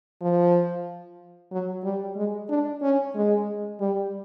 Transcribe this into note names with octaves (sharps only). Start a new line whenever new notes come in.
F3
F#3
G3
G#3
D4
C#4
G#3
G3